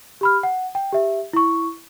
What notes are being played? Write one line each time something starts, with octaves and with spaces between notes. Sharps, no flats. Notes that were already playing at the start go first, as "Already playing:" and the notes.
G4 B5 F6
F#5
G5
G4 E5
E4 C#6